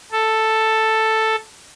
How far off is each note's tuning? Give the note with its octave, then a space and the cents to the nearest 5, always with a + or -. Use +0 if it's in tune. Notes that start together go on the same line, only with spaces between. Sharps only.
A4 +5